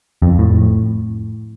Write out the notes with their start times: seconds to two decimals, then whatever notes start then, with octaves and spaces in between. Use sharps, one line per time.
0.22 F2
0.39 A2